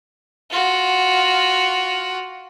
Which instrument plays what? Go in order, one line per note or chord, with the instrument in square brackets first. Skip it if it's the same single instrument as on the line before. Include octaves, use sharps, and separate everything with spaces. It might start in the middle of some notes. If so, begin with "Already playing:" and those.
[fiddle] F4 F#4